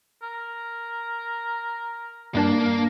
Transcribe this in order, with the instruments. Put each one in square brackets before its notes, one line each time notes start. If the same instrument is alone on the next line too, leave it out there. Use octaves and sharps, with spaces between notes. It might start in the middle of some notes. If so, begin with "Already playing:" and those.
[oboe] A#4
[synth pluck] G2 D4 A5 [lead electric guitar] A#3